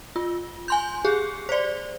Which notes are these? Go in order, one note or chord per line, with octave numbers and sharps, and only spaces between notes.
F4
G#5 C6 G6
G4 G#4
C5 D5